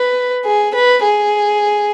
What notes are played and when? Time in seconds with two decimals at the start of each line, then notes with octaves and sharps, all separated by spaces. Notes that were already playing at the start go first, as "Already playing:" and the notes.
Already playing: B4
0.45 G#4
0.74 B4
1.03 G#4